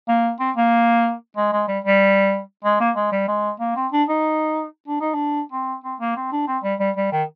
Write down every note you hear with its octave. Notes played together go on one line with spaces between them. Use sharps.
A#3
C4
A#3
G#3
G#3
G3
G3
G#3
A#3
G#3
G3
G#3
A#3
C4
D4
D#4
D4
D#4
D4
C4
C4
A#3
C4
D4
C4
G3
G3
G3
D#3